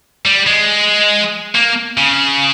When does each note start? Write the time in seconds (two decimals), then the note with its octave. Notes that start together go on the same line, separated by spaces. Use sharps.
0.25 G3
0.47 G#3
1.55 A#3
1.97 C#3